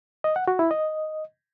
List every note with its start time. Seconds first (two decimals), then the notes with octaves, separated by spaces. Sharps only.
0.24 D#5
0.36 F#5
0.48 F#4
0.59 E4
0.71 D#5